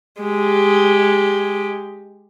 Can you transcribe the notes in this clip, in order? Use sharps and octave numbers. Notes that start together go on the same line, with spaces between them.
G#3 G4